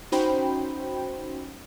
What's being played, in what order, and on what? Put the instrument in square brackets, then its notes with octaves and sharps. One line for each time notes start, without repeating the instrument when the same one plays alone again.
[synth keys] C#4 D#4 F#4 C5 G5 B5